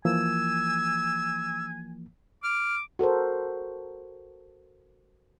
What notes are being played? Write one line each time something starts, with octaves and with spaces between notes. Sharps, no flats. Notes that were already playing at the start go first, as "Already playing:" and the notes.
E3 F3 A#3 G#5 E6
D6 F6
F#4 A4 A#4 C5